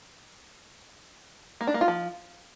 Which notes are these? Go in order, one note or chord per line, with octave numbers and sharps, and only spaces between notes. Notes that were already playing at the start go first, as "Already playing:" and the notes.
A#3
D4
A#3
F4
F3